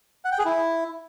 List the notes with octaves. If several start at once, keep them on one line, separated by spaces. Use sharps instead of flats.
F#5
G5
G#4
E4